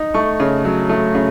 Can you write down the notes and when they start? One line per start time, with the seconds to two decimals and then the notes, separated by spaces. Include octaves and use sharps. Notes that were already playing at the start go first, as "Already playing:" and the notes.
Already playing: D#4
0.14 A3 C#6
0.40 C#3
0.65 F#3
0.89 A3
1.15 C#3